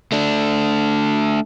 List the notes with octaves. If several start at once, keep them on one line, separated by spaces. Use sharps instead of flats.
A3 D4